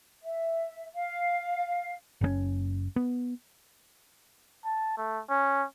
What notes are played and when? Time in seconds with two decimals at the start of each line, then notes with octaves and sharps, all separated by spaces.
0.24 E5
0.95 F5
2.21 F#1 C#3 C#4
2.96 B3
4.65 A5
4.97 A3
5.29 C#4